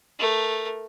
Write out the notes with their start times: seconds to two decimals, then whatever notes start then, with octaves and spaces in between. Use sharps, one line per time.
0.19 A3 A#4